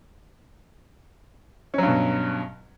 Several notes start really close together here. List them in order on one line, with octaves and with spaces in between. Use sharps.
C#4 F#3 G2 B2